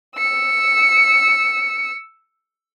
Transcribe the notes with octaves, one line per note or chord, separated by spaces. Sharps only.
E6 C#7